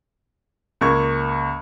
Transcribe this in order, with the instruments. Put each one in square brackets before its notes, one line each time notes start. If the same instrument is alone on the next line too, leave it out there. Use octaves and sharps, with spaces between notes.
[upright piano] C#2 A#3 C#6 G#6